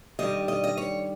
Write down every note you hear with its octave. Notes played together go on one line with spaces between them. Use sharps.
G2 D#3 G3 D#5
D#5
D#5
C#5